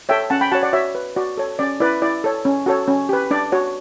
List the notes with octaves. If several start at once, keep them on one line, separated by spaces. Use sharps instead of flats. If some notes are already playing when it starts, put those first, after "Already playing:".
A4 C#5 E5 G5
C#4 F#5 A5
G5 B5
F#4 C#5 F#5 A5
D5 F#5
F#4 C#5 E5
B4
F#4 D5
A4 C#5
C#4 D5
E4 B4 D5
E4 D5
A4 C#5
C#4
F#4 A4 C#5
C#4
G4 B4
D4 D5
F#4 C#5